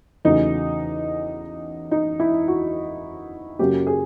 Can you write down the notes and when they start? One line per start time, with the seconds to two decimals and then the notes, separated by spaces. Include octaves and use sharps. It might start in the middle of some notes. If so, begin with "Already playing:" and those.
0.25 E2 C#3 F#3 A3 D#4
1.91 D#4
2.20 E4
2.48 F#4
3.59 F#2 C#3 F#3 A#3 G4
3.87 G#4